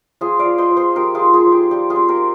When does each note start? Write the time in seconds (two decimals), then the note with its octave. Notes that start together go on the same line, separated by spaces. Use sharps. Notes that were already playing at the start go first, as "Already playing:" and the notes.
0.21 F3 F4 G#4
0.39 D5 F5
0.46 F3
0.58 C5 D#5
0.71 F3
0.77 G#4 C5
0.96 F3 G4 A#4
1.15 F4 G#4
1.21 D#4
1.34 F4 G#4
1.46 F3
1.52 G4
1.71 G3 G4
1.90 F4 G#4
1.96 C4
2.08 G4 A#4